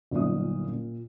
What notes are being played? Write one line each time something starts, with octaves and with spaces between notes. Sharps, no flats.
G1 A#2 F#3 D#4 E5 D#6
A#2